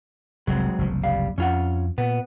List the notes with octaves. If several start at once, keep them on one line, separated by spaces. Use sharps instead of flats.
F1 C2 F#3 G#3 C4
F#1 C2 F3
G3 F5
F2 C#4 F4 F#5
A#2 B3